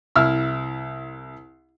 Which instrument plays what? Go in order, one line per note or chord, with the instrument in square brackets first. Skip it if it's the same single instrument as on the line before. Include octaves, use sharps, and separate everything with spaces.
[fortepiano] C2 E4 E6 F6